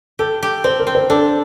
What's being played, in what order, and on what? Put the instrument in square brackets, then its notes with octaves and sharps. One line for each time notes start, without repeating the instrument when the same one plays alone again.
[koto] G4 [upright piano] A4
[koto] G4
[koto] C4 [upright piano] C5
[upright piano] A#4
[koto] C4
[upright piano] C5
[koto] D4 [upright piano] A4